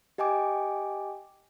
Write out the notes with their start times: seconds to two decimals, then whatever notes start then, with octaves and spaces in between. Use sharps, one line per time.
0.18 G4 D#5 G5 G#5 D6